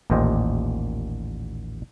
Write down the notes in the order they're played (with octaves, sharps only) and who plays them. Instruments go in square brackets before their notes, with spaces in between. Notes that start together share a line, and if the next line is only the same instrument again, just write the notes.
[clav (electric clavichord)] A1 D#2 A#2 G4 C5 D#5